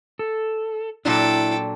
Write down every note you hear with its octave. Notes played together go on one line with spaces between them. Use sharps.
A4
A#2 F#3 D4 E4 A4 G5